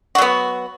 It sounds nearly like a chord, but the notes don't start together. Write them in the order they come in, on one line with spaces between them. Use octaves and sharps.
F#4 F#3 B3